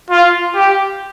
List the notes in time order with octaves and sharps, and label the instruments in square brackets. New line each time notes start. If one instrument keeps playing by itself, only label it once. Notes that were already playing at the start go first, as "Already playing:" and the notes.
[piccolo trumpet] F4
G4